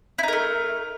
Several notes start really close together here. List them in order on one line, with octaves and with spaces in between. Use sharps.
E4 D#4 A#4 A3